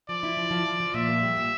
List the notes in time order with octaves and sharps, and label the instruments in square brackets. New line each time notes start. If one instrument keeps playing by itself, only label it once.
[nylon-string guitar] F3 [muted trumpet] D5
[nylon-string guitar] E4
F3
F3
F3
F3
[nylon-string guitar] A#2 [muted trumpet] E5
[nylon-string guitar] A#3
G3
A#2